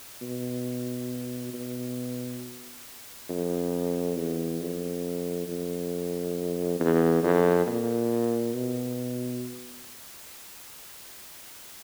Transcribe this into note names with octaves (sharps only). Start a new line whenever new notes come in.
B2
B2
F2
E2
F2
F2
E2
F2
A#2
B2